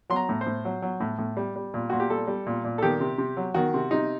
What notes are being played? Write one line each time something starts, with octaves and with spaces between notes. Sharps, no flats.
F#3 C6
A#5
A2
C5
A2
F#3
F#3
A2
A2
G3
G3
A#2
A#2 F#4
G4
G3 A4
G3
A#2
A#2
A4
D#3 G4
C3
C3
F#3
D#3 F#4
C3
C3 D#4